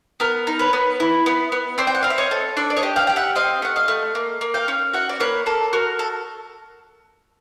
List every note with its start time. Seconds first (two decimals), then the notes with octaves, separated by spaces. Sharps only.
0.20 B3 A#4
0.47 D#4
0.59 B4 C#5
0.73 B3
1.00 E4
1.26 B3
1.52 B3
1.78 C4 C5 D5
1.87 G5
1.95 F#5
2.03 C4 F5
2.10 E5
2.18 C#5 D#5
2.31 A4
2.57 D4 D5 E5
2.70 D5
2.77 C#5 D#5
2.83 G4
2.96 F5 G5
3.07 G4 G5
3.16 E5 F#5
3.35 C4 D#5 F5
3.62 A3 F#5
3.76 D#5 F5
3.88 A3
4.15 A#3
4.41 A#3
4.54 F5 G5
4.68 C#4
4.93 F#4 E5 F#5
5.09 D5
5.20 A#3 B4 C#5
5.46 A#3 A4
5.73 F#4 A#4
5.99 A4